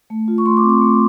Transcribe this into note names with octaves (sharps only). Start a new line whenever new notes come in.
A3
F4
C#6
A3 C6
D6
C4
D6
A3